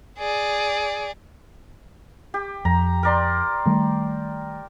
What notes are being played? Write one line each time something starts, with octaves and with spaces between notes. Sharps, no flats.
G#4 D5
G4
F2 A#5
A#4 D5 C6
D#3 G3 A3